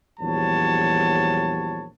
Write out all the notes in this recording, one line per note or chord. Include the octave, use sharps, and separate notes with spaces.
A#1 E2 F#3 G3 C#5 A5